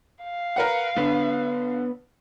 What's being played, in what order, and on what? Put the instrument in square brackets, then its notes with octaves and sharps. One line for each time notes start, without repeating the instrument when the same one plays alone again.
[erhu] F5
[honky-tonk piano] A#4 B4 F#5
[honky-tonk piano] D3 [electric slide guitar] B3 B4 C#5